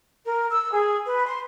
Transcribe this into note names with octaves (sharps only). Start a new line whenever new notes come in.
A#4
E6
G#4
B4
C6